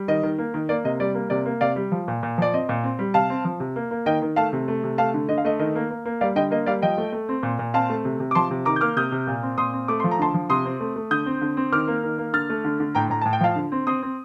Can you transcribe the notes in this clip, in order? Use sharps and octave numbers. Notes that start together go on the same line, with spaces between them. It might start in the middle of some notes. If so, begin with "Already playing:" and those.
Already playing: G3
D#3 D#5
D#3
A#3
D#3
A#3 D5
C3 D#5
G3 D5
A#3
C3 D5
A#3
C3 D5 F5
G3
F3
A#2
A#2
F3 D5
C4 D#5
A#2
C4
G3
C3 F5 A5
C4
F3
C3
A#3
A#3
D#3 D#5 G5
D#3
A3 F5 A5
C3
A3
C3
A3 F5 A5
D3
D3 D#5
F5
A3 D#5
D#3 D#5
A#3
A#3
A#3
G3 D5 F5
D3 D#5 G5
A#3 D#5
G3 D5 F5
F3 D#5 G5
A3
A3
C4
A#2
A#2
C4 F5 A5
A3
C3
C3
D6
F3 A5 C6
C3
D#3 A#5 D6
G6
A#3 D6 F6
C3 D#6 G6
C3
A#2
C4
A#2 C6 D#6
C4
A3 D6
F3 C6
A#5
D3 A5 C6
F3
C3 C6 D#6
C4
A3
A3
D3 D#6 G6
C4
D3
C4
D#3 D6 F6
A#3
D#3
A#3
D3 F6 A6
A3
D3
D3
A2 G5 A#5
A2 A#5
A2 A5
G5
F3 F5 A5
D3
C4
C4 C6 D#6
C4